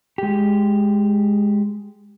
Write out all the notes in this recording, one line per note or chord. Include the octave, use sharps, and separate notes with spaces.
G#3 G4